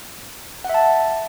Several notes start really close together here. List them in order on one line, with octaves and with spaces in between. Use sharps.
F#5 E5 A5